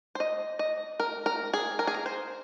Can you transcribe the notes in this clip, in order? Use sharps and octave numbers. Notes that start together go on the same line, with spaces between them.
C5
D#5
D#5
A#4
A#4
G#4
A#4
G#4
A#4
C5